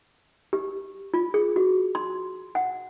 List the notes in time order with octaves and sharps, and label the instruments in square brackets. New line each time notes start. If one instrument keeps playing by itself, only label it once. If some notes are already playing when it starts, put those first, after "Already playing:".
[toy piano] G4
F4
G#4
F#4
C6
F#5